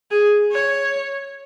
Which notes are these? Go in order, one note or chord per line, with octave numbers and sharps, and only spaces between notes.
G#4
C#5